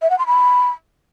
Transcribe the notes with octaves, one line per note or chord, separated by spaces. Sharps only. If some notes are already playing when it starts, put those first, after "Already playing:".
E5
F#5
C6
B5